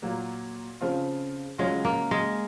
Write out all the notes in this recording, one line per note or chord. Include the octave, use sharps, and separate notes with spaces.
A#2 F#3 A#3
C#3 F3 C4 F4
C#3 F#3 G#3 C#4 F4
A#3
G#3